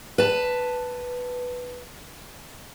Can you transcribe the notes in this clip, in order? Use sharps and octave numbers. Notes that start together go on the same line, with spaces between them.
B4 A5